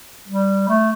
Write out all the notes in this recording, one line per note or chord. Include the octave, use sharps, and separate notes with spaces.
G3
A3